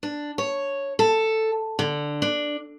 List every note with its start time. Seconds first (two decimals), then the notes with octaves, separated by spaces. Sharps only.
0.03 D4
0.38 C#5
0.99 A4
1.79 D3
2.22 D4